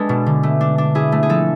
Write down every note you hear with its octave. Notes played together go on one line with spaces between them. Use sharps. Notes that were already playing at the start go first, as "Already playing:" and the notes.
Already playing: G#3 D4 A4 B4
B2
D3
A3
D4
D4
E4 G#4
A3
G#4
F3 A4